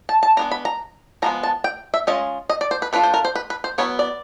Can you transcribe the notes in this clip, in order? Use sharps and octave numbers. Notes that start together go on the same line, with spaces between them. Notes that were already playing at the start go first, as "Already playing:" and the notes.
A5
A5
G#3 B3 D4 A#5
B5
A#5
F3 G#3 B3 A#5
A5
G5
E5
G#3 C#4 F4 D#5
D#5
D5
C5
B4
A3 D4 F4 B4
C5
A#4
C5
B4
B4
C5
F#3 B3 E4 C#5
D5